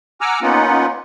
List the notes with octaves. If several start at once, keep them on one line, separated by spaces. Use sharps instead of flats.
F#5 G#5 A#5 D6 E6 F6
A#3 B3 C#4 D#4 F4 F#5